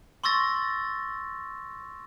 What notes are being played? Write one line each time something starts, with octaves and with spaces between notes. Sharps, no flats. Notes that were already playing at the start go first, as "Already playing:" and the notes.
C6 C#6 E6 A6 A#6